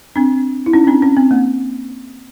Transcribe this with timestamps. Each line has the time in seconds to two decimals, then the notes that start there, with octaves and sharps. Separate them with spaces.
0.16 C4 D4
0.66 E4
0.73 C#4 D#4
0.84 C#4
0.87 C4 D4
1.02 C#4
1.16 C4
1.31 A#3